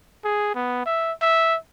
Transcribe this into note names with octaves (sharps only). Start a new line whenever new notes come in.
G#4
B3
E5
E5